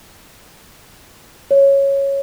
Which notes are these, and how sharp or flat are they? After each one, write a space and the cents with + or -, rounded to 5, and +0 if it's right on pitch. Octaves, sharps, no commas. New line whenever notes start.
C#5 -5